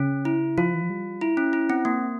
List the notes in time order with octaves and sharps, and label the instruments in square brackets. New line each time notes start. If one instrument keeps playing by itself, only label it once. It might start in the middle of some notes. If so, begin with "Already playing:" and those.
Already playing: [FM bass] C#3 [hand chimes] C#4
[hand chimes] E4
[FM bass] F3 [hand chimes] F4
[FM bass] E3
F3
G3
[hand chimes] E4
C#4
E4
C4
A#3